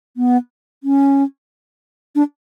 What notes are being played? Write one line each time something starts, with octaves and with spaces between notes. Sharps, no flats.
B3
C#4
D4